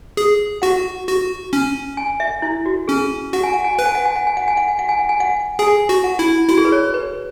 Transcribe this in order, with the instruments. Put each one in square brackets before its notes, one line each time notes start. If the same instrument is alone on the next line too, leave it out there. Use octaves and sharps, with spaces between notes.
[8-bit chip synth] G#4
[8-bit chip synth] F#4 [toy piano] F#5
[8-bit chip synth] F#4
C#4
[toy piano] G#5
E5
E4
F#4
[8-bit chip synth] C#4 [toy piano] G#4
[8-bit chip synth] F#4 [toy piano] F#5
[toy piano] G#5
F#5
G#5
[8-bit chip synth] B4 [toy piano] F#5
[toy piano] G#5
F#5
G#5
F#5
G#5
F#5
G#5
F#5
G#5
F#5
G#5
F#5
G#5
F#5
[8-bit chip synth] G#4 [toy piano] G#5
[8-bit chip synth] F#4
[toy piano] F#5
[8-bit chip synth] E4
[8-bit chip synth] E4 [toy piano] F#4
[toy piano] G#4
B4
C#5
B4